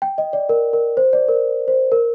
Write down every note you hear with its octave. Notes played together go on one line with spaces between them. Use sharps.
G5
D#5
D5
A#4
A#4
C5
D5
A#4
C5
A#4